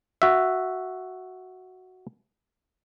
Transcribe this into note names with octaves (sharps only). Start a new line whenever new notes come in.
F#4 E5